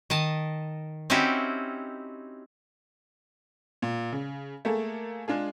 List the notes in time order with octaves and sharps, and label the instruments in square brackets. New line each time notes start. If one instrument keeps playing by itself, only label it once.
[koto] D#3 D#5 A5
C4 C#4 D#4 E4 F#4 G4
[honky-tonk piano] A#2
C#3
A3 A#3 G#4 A4
G#3 D4 F4 G#4